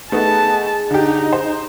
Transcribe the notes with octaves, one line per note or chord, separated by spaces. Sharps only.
A3 B3 D#4 G#4 A5
D3 D#4 G4
C5